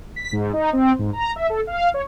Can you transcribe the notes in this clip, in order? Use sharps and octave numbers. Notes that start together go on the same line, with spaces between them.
B6
G#2
D#4
C4
G#2
A#5
E5
A4
F5
C#5